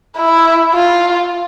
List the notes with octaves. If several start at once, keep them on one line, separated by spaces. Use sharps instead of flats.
E4
F4